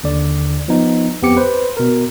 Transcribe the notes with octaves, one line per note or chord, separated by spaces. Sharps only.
D#2 D3 D5
F3 B3 D#4
F2 B3 C4 G4 D6 C#7
B4 C5
B2 A#4